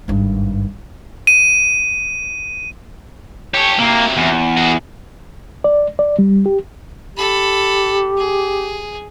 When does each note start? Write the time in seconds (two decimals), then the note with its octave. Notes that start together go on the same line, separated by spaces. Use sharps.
0.08 G#1 G2
1.27 D#7
3.54 G4 A4 C#5
3.79 C3 F#3 A#3
4.17 E2
4.57 F#4 G#4
5.64 D5
5.99 D5
6.19 G3
6.46 G4
7.17 G4 A4 B5
8.17 G#4